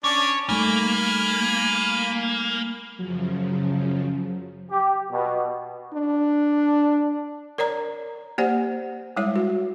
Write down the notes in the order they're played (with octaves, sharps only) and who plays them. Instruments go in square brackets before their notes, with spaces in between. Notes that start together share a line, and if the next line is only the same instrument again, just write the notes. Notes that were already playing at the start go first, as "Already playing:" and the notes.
[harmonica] C#4 D4 D5 [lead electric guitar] C#5
[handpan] G3 A3 D#4 [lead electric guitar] A#3 [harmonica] G#5 B5
[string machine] F#2 C#3 F3 [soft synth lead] F#3
[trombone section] G4
B2
[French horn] D4
[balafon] A#4 C#5 D5 A#5
A#3 G4 C5 D5 F#5
G3 G#3 E4 C#5
F#4